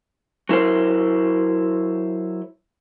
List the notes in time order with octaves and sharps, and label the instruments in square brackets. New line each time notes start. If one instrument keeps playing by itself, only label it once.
[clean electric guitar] F#3 E4 A#4 C5